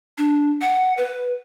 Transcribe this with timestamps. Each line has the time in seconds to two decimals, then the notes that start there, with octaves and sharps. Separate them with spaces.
0.18 D4
0.61 F#5
0.97 B4